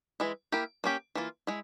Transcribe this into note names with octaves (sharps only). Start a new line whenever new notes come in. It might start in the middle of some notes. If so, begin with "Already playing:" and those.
E3 G#3 E4
A#3 E4 G4 A#4
A#3 C#4 G4
E3 A#3 F4
G#3 E4